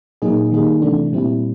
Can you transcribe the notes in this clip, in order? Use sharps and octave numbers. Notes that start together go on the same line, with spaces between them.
A#2 F#3 A#3 D#4 G#4
D#3 G3 A#3 D#4 G#4
C3 E3 A3 D4
A#2 G3 C4 E4